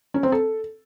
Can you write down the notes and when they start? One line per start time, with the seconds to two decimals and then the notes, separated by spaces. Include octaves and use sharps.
0.14 C#4
0.23 C4
0.32 A4